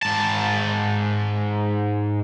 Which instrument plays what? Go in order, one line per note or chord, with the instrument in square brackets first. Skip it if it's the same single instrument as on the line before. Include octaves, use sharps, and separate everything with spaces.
[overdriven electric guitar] G#2 A5